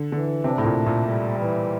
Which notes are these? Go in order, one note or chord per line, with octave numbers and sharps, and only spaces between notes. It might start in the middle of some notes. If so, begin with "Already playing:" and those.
Already playing: D3
D3 E3
C3 D4
A2
A#2
A3
A#2
G3
E3